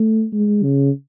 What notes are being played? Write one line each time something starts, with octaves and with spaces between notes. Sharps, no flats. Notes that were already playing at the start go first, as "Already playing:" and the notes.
Already playing: A3
G#3
C#3